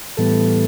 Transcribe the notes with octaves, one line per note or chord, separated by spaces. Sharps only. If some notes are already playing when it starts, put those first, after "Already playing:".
A2 E3 G3 B3 A4